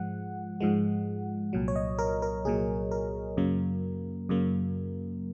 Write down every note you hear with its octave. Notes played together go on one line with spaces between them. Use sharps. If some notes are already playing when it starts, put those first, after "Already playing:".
Already playing: G#2 F3 G#3 F#5
G#2 F3 G#3
C2 A#2 F#3
C#5
D#5
A#4
A#4
C2 A#2 F#3 G#4
A#4
F#2 C#3 F#3 A#3
F#2 C#3 F#3 A#3